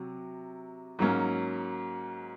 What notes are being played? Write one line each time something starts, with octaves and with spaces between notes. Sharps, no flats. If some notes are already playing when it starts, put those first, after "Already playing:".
Already playing: C3 F#3
G#2 F#3 A#3 C#4